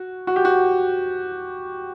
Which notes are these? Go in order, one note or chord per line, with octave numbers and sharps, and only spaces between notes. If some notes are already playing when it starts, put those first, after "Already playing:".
Already playing: F#4
F#4
G4
F#4